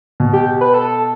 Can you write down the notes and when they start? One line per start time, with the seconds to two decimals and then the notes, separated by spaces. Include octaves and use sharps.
0.20 B2
0.33 G4
0.61 B4
0.74 A4